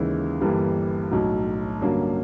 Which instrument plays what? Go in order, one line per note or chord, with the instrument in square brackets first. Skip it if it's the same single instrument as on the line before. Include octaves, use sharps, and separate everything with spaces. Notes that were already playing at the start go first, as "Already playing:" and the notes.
Already playing: [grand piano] D#2 C#3 E3 G#3
G1 G2 E3 G3 A#3
B1 A2 F#3
G2 D3 F#3 A#3 C#4